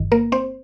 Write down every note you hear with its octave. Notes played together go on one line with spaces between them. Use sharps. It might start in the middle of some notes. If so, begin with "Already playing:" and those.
Already playing: G1 G2 D#3
A#3 A#4
C4 C5